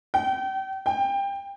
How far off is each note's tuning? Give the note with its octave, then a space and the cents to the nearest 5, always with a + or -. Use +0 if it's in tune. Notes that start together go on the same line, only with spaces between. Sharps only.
G5 -35
G5 +20